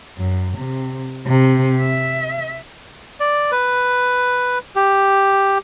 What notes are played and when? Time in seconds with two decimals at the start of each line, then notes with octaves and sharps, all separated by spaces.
0.18 F#2
0.58 C3
1.27 C3
1.81 E5
3.20 D5
3.51 B4
4.76 G4